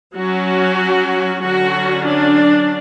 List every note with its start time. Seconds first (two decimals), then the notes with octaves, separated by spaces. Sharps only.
0.15 F#3 C#4 F#4
1.43 D3 F#3 C#4 F#4
2.07 D4